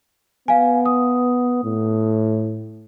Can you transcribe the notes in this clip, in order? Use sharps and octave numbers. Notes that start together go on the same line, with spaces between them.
B3 F5 G#5
D#6
A2